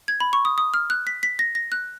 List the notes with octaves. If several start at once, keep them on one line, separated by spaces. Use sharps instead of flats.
G#6
B5
C#6
D#6
D#6
F6
F#6
B6
B6
A#6
A#6
F#6